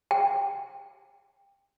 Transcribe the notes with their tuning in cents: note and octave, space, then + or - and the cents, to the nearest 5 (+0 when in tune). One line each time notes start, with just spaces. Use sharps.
G5 +20